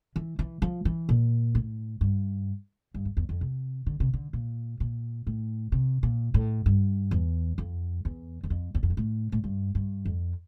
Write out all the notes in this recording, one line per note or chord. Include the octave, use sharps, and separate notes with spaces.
E3
E3
F3
E3
A#2
A2
G2
G2
F2
E2
F2
C3
D3
C3
D3
A#2
A#2
A2
C3
A#2
A2
G2
E2
F2
E2
E2
F2
E2
F2
G2
A2
A2
G2
G2
F2